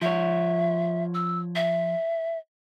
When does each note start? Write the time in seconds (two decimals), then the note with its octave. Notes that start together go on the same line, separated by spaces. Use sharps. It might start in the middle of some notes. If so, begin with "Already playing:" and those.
0.02 F3 C#5 E5
1.14 E6
1.55 E5